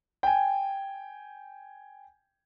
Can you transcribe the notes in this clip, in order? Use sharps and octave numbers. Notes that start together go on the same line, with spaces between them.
G5 G#5